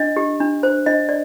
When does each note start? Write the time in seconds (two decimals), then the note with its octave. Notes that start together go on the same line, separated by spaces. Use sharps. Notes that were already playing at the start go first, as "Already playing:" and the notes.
Already playing: D4 D#5
0.17 G4
0.40 D4
0.63 C5
0.86 D4 D#5
1.09 D5